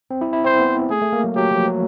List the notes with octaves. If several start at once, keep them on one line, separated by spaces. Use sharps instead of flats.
C4
E4
E4
C4 C5
B3
A3 G#4
A3
A#3
F#3
F#3 G4
F3
F#3